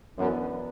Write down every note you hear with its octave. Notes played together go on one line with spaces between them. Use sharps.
F#2 E3 B3 D4